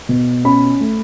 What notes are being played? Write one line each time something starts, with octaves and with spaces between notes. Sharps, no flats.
B2
C#4 B5
A3